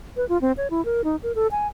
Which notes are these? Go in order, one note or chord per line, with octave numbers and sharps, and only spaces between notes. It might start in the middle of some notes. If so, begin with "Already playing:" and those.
B4
F4
C4
C#5
E4
A#4
D#4
A#4
A4
G#5